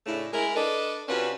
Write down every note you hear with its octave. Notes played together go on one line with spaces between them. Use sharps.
A2 C#3 A3 D4 E4
G#3 E4 G#4 A#4
D4 A4 B4 D5 D#5
C3 C#4 D4 F4 F#4 B4